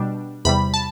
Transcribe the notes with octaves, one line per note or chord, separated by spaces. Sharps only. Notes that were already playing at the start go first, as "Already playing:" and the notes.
Already playing: B2 G3 D4
E2 C3 G3 B5
A5